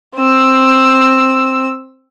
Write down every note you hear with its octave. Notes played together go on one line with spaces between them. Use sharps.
C4 E6